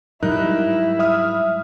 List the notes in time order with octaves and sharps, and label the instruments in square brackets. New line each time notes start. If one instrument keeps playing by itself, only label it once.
[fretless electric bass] G#2 F#3 G3 [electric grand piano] D#4 A#4 F#6 [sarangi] E4
[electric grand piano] E5 D#6 F6